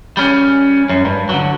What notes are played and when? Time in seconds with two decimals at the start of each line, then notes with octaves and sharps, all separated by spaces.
0.17 G3 C#4
0.89 F#2
1.05 G2
1.29 D3 F#3